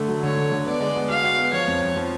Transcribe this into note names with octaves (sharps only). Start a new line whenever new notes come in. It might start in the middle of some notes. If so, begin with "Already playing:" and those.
Already playing: D3 A3
F#3
D3 C#5
D3
D3
B3 D5
G#3
B3
F#4 F5
F#4
B3
F3 C#5
F2
F2
F3